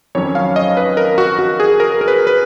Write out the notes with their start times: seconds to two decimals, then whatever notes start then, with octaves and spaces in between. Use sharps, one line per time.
0.15 F2 D#3 F#3 C#4 C#5
0.35 F5
0.56 D#5
0.77 B4
0.97 A#4
1.18 F#4
1.39 F#4
1.60 G#4
1.80 A#4
2.01 A#4
2.08 B4
2.27 B4